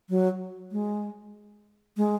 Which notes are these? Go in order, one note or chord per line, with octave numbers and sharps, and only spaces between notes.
F#3
G#3
G#3